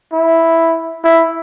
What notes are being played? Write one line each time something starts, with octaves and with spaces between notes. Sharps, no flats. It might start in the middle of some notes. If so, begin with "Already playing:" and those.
E4
E4